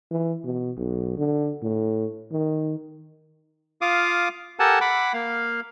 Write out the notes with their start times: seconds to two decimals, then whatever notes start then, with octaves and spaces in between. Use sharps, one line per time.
0.11 E3
0.44 B2
0.77 B1
1.17 D3
1.62 A2
2.31 D#3
3.81 F4 F5 D6 D#6
4.59 G4 A4 A#4 F#5 G#5 A5
4.81 F#5 B5 D6
5.14 A#3 F5